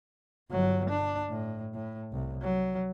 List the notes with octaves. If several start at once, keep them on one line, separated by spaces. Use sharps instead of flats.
G1 F#3
D4
A2
A2
C2
F#3